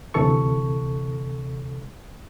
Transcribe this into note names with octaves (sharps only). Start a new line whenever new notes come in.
D2 C3 E3 A4 C#6